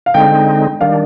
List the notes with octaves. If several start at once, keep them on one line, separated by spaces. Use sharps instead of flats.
F5
D3 G#3 C4 D#4 G5
D#3 G3 D4 F5